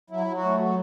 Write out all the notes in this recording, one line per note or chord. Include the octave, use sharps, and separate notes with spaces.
F#3 E4
F#3
F#4
A3
F#3 F#4